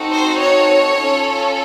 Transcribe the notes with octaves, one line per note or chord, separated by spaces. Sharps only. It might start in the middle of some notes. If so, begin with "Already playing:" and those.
Already playing: C4 D#4 F#4 A4
C5
C#5
C#4 F4 A4